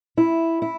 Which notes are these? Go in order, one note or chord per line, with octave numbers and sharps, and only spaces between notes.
E4
E4